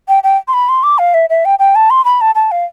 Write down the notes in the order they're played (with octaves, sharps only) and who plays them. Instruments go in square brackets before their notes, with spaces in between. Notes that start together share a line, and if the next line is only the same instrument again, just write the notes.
[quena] G5
G5
C6
B5
C6
D6
F5
E5
E5
G5
G5
A5
C6
B5
A5
A5
F5